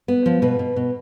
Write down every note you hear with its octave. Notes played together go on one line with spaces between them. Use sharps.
B3
F3
B2 B4
B2
B2